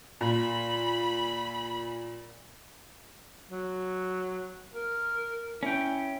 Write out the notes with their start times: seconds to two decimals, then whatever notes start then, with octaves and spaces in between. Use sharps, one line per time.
0.21 A#2 B5
3.51 F#3
4.74 A#4
5.63 C#4 E4 G5